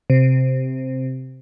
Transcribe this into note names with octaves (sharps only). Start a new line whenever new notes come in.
C3